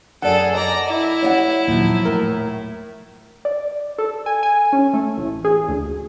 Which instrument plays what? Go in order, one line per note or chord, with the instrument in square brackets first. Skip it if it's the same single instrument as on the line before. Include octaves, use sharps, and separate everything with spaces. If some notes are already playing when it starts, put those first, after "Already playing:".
[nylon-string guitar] F#2 D5 [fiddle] G#4 A4 [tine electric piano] F#5
[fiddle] D5 A#5 [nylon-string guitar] D#5
[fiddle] E4
[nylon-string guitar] C#5 D#5 F#5
[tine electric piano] D#2 A#2 [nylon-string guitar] F3 F#3
[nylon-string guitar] A2 [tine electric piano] A#4
[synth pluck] D5
A4
G#5
G#5
C#4
A3
A1
G#4
D2